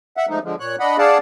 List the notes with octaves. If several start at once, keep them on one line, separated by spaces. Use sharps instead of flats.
E5 F#5
F3 G#3 A3 D#4
D3 F3 G#3
A#2 C#5 F#6
D4 D#5 F#5 B5
D4 G#4 D5 F5 F#5 A5